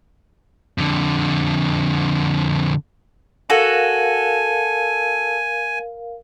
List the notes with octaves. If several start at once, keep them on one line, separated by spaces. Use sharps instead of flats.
F2 D3
F#4 A4 A#4 F5 G#5